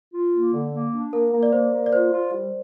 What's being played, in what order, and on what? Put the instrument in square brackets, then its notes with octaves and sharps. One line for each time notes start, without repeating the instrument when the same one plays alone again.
[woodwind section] F4
A#3
D3
A#3
D4
[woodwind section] A#3 [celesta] A#4
[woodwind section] A#3
[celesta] D5
[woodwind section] A#3 [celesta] C5
[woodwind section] A#3
[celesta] D5
[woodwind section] F4 [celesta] C5
[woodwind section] F4
G3